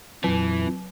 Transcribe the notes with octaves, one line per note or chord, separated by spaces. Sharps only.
F2 A#2 E3 F#3